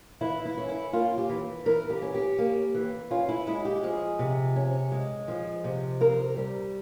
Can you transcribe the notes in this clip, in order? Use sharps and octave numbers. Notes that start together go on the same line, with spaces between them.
E3 E4
E4
C#4
E4
A#3 F4
G4
E3
E3 A#4
G4
C#4
G4
A#3
E3
C#4 F4
E4
G#3 E4
G4
F3 G#4
C3
C#4
G#3
F3
C3
C4 A#4
G3